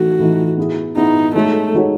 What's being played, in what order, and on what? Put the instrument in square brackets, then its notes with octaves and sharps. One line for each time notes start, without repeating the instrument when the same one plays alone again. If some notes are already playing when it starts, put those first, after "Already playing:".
Already playing: [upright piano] E3 A3 D#4 [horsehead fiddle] F#4
[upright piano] E3 A3 D#4
B3 E4 G#4
[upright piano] B3 E4 G#4 [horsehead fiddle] D#4
[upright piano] G#3 D#4 F#4 A4 C#5 [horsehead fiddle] A3
[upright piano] G#3 D#4 F#4 A4 C#5